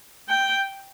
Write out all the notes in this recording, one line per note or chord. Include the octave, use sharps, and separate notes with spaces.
G5